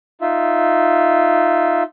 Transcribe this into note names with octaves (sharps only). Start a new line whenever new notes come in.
D#4 F4 E5